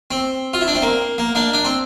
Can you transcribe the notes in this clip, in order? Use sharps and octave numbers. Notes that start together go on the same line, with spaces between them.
C4
F4
E4
D4
C4
A#3
A#3
A#3 D4
D4
C4